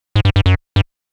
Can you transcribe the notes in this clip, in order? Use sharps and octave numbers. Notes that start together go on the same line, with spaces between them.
G#2
G2
G2
F#2
G2